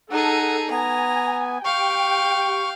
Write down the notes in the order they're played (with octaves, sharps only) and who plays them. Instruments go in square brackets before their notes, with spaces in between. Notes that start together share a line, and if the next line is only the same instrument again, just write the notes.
[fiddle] D#4 G#4 [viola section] A4 [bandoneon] F#5
[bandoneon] B3 [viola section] G#5 [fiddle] A#5
[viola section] G4 G5 [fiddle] F5 [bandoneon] C#6